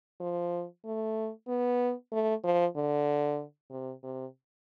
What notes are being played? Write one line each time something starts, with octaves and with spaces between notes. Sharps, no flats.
F3
A3
B3
A3
F3
D3
C3
C3